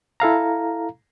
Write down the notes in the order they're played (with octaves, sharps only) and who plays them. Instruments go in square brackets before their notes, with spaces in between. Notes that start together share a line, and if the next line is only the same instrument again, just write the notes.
[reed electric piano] E4 A4 F5 A#5